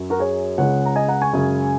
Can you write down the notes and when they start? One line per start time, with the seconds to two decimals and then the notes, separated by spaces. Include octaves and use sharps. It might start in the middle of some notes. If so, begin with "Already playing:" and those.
Already playing: F#2 F#3
0.10 F#4 A#4
0.19 G#4 C#5
0.58 C#2 C#3 G#3 C#5 F#5
0.86 A#5
0.96 D#5 G#5
1.08 F#5 A#5
1.22 G#5 C#6
1.33 F#2 C#3 G#3